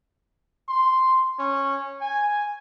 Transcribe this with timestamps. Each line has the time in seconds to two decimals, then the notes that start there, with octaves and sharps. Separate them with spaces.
0.68 C6
1.39 C#4
2.01 G#5